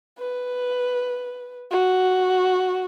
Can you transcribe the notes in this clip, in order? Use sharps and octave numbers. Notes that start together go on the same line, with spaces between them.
B4
F#4